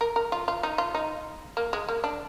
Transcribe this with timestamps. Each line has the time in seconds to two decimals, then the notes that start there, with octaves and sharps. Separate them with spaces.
0.01 A#4
0.16 A#4
0.32 F4
0.48 F4
0.63 D#4
0.78 F4
0.95 D#4
1.57 A#3
1.73 G#3
1.88 A#3
2.04 D4